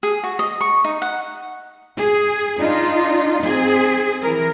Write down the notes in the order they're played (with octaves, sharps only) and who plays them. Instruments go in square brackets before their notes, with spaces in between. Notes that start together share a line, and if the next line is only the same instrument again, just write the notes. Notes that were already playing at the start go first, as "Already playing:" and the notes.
[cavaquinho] G#4
F#4
D#5
C#6
D#4
F#5
[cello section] G#4
D4 D#4 F4
C4 G#4
E3 A#4